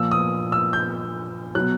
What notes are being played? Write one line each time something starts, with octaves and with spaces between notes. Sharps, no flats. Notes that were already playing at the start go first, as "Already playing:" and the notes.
Already playing: A#2 F3 E6
D#6
E6
G6
B2 F#3 F#6